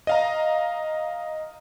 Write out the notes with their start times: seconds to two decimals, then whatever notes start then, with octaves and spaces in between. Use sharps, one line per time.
0.07 D#5 F5 A#5